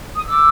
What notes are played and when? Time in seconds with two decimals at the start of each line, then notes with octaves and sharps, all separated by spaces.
0.14 D#6
0.25 D6 E6